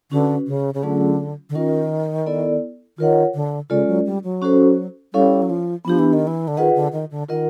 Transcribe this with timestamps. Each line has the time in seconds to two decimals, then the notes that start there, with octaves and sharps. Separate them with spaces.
0.11 D3 C#4 F#4 B4
0.47 C#3
0.74 C#3
0.83 D3 F#3 A3 C#4 F4 G#4
1.50 D3
1.55 D#3 C#4 F4 A#4
2.26 B3 E4 A4 D5
2.98 D#3 F4 A#4 C#5 F#5
3.34 D3
3.70 C#3 G#3 C#4 F4 A4 D5
3.88 F#3
4.06 G3
4.24 F#3
4.42 C#4 F#4 A4 C5
5.14 G3 C#4 E4 A4 C#5 F5
5.42 F#3
5.50 F3
5.85 F3 B3 D4 G4
5.99 E3
6.13 D#3
6.27 E3
6.48 D3
6.57 D#3 F4 G#4 B4 D#5 F#5
6.75 D3
6.93 D#3
7.11 D3
7.29 D#3 F4 A#4 D#5 F#5